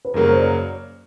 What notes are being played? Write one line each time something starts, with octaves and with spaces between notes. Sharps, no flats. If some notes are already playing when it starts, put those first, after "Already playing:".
B4
F#2 C#3 F#3 A#3 A#4
C5
D5
C#5